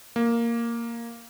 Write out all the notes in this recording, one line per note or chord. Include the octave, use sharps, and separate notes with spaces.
A#3